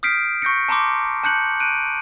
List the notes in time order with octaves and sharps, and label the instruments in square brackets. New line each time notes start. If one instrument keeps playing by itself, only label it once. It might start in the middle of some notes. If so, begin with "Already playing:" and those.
[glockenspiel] D#6 F6 G6 B6 C7 D7
C#6 G6 A#6 C#7
A5 A#5 C6 D6
A5 F#6 G6 C#7 F#7
F#6 D7 D#7